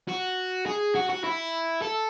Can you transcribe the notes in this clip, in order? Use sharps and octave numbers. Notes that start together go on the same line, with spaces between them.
F#4
G#4
F#4
F#4
E4
A4